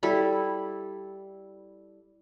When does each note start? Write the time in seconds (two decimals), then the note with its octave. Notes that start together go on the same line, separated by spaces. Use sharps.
0.03 G3 E4 A4 B5